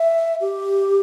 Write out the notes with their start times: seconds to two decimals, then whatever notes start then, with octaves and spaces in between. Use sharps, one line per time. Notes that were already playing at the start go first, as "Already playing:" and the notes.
Already playing: E5
0.40 G4